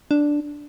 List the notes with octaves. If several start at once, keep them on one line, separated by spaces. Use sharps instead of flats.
D4